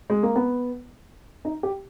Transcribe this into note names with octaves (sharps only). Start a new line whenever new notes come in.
G#3
A#3
B3
D#4
G4